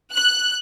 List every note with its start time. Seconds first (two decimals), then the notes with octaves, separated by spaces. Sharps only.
0.12 F#6